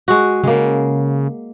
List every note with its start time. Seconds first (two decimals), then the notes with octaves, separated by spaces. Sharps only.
0.08 G#3 F#4
0.43 C#3 G#3 A#3